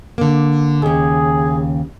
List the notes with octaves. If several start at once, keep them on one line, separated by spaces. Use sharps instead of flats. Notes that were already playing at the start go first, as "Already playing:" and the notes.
D3 A#3
D#2 C#3 G#4